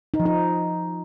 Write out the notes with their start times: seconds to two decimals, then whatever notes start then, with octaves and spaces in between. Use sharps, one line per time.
0.14 D#4
0.20 F3
0.26 D#4